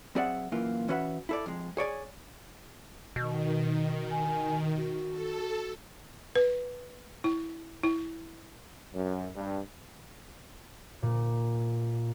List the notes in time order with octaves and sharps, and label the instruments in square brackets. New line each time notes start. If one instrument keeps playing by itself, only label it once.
[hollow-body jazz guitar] F#3 C4 G#4 D5 E5 F#5
F#2 A#2 E3 A#3 F4
E3 C#4 F#4 B4 E5 F#5
E4 A4 D5
F2 G#3
G#4 C#5 D5 G#5
[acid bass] B2 [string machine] D#3
[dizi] G#5
F#4
[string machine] A4
[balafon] B4
E4
E4
[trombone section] F#2
G2
[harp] A#2